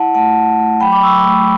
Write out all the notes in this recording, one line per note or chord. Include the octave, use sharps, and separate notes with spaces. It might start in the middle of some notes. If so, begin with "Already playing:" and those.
Already playing: E4 F#5 A5
A3 F#5 A5
A3
A3
F#3 G5 B5
B5 D6
F#3 C#6 E6
A3